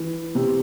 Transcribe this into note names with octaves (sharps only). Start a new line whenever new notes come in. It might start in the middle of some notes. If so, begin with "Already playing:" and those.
Already playing: E3
C3